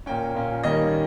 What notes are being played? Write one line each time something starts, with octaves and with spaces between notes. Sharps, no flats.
A#2 A#3 C#4 G5
A#2 A#3 C#4
D#2 D#3 G3 A#3 C#4 D#5